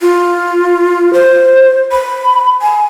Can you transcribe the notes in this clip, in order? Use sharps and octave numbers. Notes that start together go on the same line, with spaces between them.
F4
C5
B5
G#5